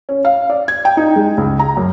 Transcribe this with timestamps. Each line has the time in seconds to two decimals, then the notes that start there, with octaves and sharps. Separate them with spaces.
0.09 C#4
0.25 F5
0.50 D5
0.68 G#6
0.85 G5
0.97 D#4
1.16 G#3
1.37 C#2
1.59 A#5
1.77 F#2